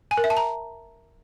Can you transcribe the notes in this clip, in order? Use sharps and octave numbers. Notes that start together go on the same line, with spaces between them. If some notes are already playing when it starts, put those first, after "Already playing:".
G#5
A#4
E5
A5
A#5